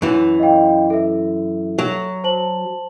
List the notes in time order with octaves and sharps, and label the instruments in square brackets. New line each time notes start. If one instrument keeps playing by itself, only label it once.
[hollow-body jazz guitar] F#2 E3
[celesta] D#5 F5 G5
A4 E5
[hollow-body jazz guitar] F#3
[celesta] C5 A5 F#7